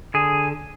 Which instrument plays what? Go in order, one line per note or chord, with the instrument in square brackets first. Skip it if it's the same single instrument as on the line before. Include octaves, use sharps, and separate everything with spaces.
[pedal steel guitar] D3 G#4